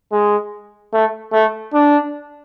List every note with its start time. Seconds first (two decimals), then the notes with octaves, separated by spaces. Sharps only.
0.12 G#3
0.93 A3
1.33 A3
1.73 D4